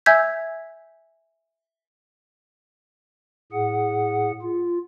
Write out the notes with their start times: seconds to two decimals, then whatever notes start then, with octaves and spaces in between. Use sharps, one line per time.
0.06 E5 G#5 E6 G6 G#6 B6
3.52 A2 G#4 F#5
4.42 F4